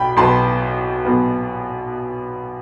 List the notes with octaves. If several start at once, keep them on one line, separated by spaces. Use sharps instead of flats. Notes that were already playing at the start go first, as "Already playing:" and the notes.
Already playing: B1 B2 G5 B5
B1 B2 B3 A5 C6
B1 B2 B3